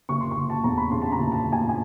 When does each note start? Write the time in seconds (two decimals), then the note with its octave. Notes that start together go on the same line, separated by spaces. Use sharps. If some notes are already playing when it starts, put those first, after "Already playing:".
0.09 F#1 C#6
0.21 C6
0.31 F#1 C#6
0.50 A5
0.64 E2 A#5
0.77 B5
0.91 C#3 C6
1.02 A5
1.12 A#5
1.18 F#1
1.32 A5
1.46 F#1
1.52 G#5
1.69 G#5